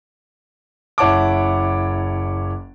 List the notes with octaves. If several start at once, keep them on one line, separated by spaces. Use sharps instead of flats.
F#1 E4 C#5 F#5 A5 D6